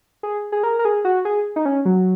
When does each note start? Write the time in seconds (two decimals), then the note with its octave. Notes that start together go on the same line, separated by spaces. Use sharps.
0.23 G#4
0.52 G#4
0.63 A#4
0.79 A#4
0.85 G#4
1.05 F#4
1.25 G#4
1.56 D#4
1.65 C#4
1.85 F#3